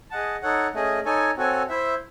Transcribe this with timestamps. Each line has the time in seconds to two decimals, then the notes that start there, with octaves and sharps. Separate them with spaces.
0.11 G#4 D#5 F#5 A5
0.42 D#4 A4 C#5 F#5
0.74 A3 C#4 G#4 D#5
1.05 D#4 A4 C#5 G#5
1.37 C4 F#4 A4 C#5 G#5
1.69 E4 C5 E5